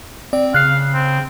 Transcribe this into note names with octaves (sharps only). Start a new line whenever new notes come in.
C4 D5
C#3 F5 F#6 C7
C4